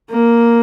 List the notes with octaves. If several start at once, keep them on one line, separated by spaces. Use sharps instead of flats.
A#3